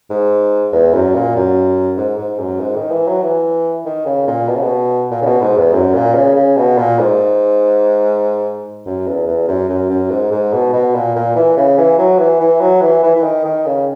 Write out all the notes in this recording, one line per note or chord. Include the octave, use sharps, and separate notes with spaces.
G#2
E2
F#2
A#2
F#2
G#2
G#2
F#2
G#2
D#3
E3
F#3
E3
D#3
C#3
A#2
B2
C#3
B2
A#2
C#3
B2
G#2
E2
F#2
A#2
C#3
C#3
B2
A#2
G#2
F#2
E2
E2
F#2
F#2
F#2
G#2
G#2
B2
B2
A#2
A#2
E3
C#3
E3
F#3
E3
E3
F#3
E3
E3
E3
D#3
D#3
C#3